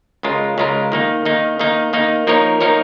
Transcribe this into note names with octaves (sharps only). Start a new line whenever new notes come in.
C#2 C#3 G#3 F4 A#4
C#2 C#3 G#3 F4 A#4
D#3 A#3 D#4
D#3 A#3 D#4
D#3 A#3 D#4
D#3 A#3 D#4
F3 A#3 D#4 A#4 C#5
F3 A#3 D#4 A#4 C#5